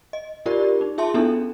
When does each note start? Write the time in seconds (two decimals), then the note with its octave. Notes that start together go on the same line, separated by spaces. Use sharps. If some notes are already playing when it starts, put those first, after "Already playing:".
0.13 D#5
0.46 D#4 F4 G4 A#4 D5
0.81 D#4
0.98 F4 G#4 E5 A5 C6
1.14 B3 C#4 D4 E4 G#4 A4